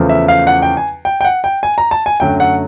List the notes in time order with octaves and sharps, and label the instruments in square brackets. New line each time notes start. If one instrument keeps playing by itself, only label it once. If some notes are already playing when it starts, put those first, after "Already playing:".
Already playing: [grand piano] E2 C#3 F3 A3
E5
F5
F#5
G5
G#5
G5
G5
F#5
G5
G#5
A#5
A5
G#5
F#2 D3 F#3 A3 G5
F#5